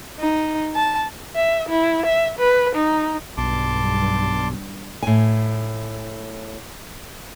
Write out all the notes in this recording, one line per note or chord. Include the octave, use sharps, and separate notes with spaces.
D#4
A5
E5
E4
E5
B4
D#4
B1 G2 A5 C6 D6
A2 G#5